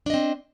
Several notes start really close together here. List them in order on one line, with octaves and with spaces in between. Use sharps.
D4 D#5 C4